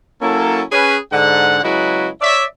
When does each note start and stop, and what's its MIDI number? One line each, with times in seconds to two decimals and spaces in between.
0.22 0.62 54
0.22 0.62 58
0.22 0.62 61
0.22 0.62 64
0.22 0.62 69
0.72 0.98 61
0.72 0.98 68
0.72 0.98 71
1.12 1.61 44
1.12 1.61 50
1.12 1.61 78
1.63 2.09 49
1.63 2.09 54
1.63 2.09 56
1.63 2.09 64
1.63 2.09 66
1.63 2.09 71
2.21 2.44 73
2.21 2.44 74
2.21 2.44 76